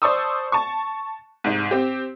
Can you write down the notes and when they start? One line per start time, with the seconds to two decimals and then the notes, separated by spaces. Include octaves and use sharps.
0.02 C5 D5 A5 C#6 D#6 E6
0.52 A5 C#6
1.44 C2 G#2
1.71 C4 G4